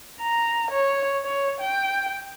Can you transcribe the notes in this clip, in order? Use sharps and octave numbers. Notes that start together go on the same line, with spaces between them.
A#5
C#5
C#5
G5